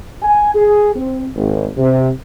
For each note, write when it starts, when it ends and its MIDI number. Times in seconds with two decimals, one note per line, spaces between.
0.22 0.51 80
0.54 0.91 68
0.96 1.24 60
1.36 1.68 32
1.77 2.08 48